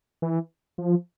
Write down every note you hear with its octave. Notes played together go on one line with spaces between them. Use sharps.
E3
F3